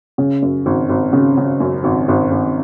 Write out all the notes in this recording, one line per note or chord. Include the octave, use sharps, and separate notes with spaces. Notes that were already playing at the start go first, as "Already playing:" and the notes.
C#3
F#2
G#1
G#1
C#3
C#3
F#2
G#1
G#1
G#1